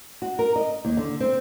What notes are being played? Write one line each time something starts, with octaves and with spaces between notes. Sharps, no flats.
F#4
A#4
D#5
D#2
D3
C4